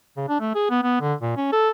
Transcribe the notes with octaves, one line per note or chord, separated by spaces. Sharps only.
C#3
D4
A3
G#4
B3
B3
D3
A#2
C#4
A4